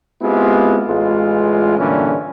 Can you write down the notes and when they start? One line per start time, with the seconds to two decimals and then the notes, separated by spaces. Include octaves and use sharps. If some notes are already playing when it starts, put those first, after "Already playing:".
0.22 G#3 B3 C4 E4 F4 G4
0.87 A1 G#3 F4
1.78 G2 A#2 D3 E3 C#4 D4